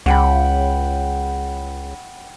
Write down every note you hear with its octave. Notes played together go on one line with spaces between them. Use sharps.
C#2 F#5 G5 B5